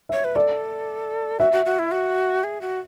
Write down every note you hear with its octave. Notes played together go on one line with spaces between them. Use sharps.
C#5 E5
B4
A4 D5
F#4 E5
F#4
F#4
E4
F#4
G#4
F#4